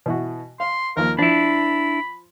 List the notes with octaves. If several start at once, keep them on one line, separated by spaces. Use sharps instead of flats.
B2 E3 F#4
F5 C6
D#2 F3 A#3 A#4
F3 D4 E4 B5